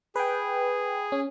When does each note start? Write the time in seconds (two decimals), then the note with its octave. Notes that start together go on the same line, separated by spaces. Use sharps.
0.16 G#4 B4 G5
1.12 C#4